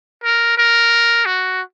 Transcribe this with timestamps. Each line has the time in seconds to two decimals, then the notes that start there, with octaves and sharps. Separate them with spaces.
0.24 A#4
0.58 A#4
1.26 F#4